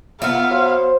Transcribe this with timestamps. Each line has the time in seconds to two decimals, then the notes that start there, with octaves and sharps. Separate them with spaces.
0.22 B3 E4 F4 F5
0.51 F#3 C5